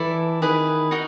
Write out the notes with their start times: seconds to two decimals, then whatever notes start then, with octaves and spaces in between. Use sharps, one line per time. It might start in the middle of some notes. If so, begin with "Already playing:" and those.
Already playing: E3 E4 A4 D5
0.41 D#3 E4 G#4 B4
0.91 D#4 F#4 A#4